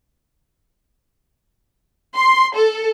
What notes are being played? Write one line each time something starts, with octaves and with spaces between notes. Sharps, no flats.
C6
A4